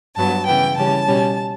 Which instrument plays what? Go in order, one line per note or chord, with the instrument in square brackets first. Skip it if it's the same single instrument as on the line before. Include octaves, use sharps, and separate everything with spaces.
[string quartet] G2 F#3 B3 A5
C#3 E3 B3 G5
C#3 E3 G3 C#4 A5
B2 G3 C#4